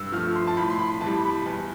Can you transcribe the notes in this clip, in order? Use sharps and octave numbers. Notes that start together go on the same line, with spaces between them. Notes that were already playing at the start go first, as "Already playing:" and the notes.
Already playing: G2 E6
F3 A3 F6
C6
A5
A2 B5
C6
B5
E3 A5
G3
B5
E2